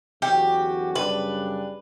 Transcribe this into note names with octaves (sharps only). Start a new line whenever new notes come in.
E2 D3 F#3 C#4 F#4 G4
F#2 C#3 G3 D4 B4